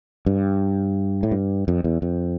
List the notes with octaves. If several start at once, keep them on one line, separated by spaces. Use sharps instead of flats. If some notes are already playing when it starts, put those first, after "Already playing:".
G2
A2
G2
F2
E2
F2